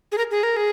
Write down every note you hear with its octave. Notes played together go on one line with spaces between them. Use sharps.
G#4
A#4
G#4
A#4
G#4